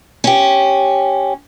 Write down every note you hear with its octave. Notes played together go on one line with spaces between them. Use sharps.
C#4 G4